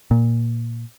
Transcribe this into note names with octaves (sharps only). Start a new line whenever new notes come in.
A#2